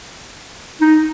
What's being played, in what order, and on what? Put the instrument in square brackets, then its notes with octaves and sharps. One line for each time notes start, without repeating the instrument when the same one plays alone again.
[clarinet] D#4